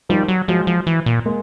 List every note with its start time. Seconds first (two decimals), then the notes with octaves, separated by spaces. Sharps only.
0.09 D#3 F3 G3
0.28 F#3
0.48 F3 F#3 G#3
0.67 F3
0.87 E3
1.06 A#2
1.26 G#3 A#3